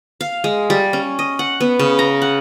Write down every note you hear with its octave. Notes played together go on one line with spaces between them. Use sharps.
F5
G#3
G3
C#4
D#5
F#5
B3
C#3
A#5
F#5